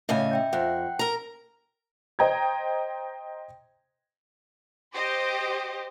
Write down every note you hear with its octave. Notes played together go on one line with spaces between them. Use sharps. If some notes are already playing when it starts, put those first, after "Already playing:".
A2 C#3 C#4 D#5 E5 G#5
E5 G5 G6
F2 F#5 G5 F#6
A#4 A#5
C5 D#5 G5 A#5 G#6
G4 C5 D#5